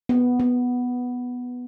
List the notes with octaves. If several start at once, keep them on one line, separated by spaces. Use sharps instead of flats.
B3
B3